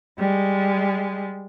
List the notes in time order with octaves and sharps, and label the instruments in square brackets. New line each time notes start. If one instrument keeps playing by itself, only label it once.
[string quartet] G3 G#3